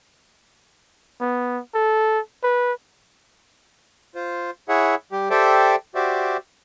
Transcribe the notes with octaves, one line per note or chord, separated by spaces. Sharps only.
B3
A4
B4
F4 C5
E4 G#4 C#5 E5 F#5
G3 G4
G4 A4 C5 D5 E5 G5
F#4 G4 C5 D5 E5